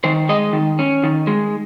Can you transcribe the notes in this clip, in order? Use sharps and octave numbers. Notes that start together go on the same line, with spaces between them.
D#3 C5
G#3 D#5
D#3
C#4
D#3
G#3